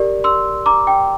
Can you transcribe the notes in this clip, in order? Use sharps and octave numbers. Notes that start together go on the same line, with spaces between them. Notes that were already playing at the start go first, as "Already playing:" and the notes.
Already playing: G4 A#4 D5
C6 E6
A#5 D6
G5